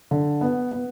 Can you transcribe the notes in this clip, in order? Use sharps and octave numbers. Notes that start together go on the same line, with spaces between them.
D3
B3
B3